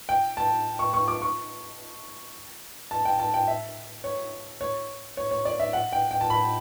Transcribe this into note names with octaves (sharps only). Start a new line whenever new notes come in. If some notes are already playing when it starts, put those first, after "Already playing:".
G5
A5
C#6
C#6
D6
C#6
A5
G5
A5
G5
E5
C#5
C#5
C#5
C#5
D5
E5
F#5
G5
G5
A5
B5